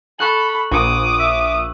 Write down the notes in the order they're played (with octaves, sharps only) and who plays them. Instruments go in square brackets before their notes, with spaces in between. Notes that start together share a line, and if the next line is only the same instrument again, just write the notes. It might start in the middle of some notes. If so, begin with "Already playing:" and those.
[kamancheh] A4 B5 [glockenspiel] C#6 F#6 F#7
[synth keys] A#1 [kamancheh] D6 D#6
[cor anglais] E5